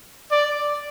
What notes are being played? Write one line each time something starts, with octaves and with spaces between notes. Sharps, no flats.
D5